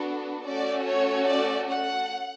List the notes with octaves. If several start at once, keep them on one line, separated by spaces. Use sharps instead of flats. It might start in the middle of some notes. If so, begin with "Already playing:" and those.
Already playing: B3 D4 F#4 A4
A3 C#4 F#4 A4 D5
C#5
D5
F#5